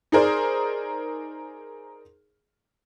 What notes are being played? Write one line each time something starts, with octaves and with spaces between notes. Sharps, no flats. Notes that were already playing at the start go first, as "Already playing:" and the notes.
D#4 G#4 A#4 C5 D5